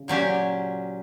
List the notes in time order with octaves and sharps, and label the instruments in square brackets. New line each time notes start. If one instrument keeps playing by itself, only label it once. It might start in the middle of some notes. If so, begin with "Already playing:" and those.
Already playing: [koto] C#3
A#2 F#3 C#4 G4